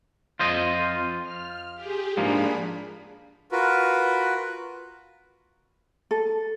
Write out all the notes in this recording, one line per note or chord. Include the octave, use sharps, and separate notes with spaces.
F2 F4 C5 D#5
F6
G4 G#4
G#2 F3 A#3 D4 G#4 B5
F4 F#4 A#4 B4
A4